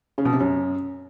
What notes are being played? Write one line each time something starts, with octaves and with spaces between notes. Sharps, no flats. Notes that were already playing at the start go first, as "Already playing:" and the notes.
C#3
B2
C3
F#2